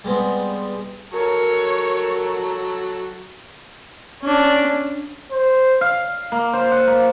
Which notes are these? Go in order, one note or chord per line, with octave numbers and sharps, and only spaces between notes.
G3 G#3 B3 C4
F#3 A4 A#4 C#5 A#5
C#4 D4
C5
F5
A#3
C5
F#5
A#3